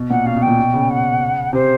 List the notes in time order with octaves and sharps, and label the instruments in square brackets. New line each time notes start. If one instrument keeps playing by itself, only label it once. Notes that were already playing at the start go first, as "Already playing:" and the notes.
Already playing: [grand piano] B2
[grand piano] A#2 [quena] F#5
[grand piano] B2 [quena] F5
[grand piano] B2
[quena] G5
[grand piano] A#2
B2
C#3
[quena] F#5
[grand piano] C3 [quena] C5